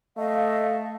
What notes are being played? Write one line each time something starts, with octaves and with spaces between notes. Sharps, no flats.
A3 D#5 F5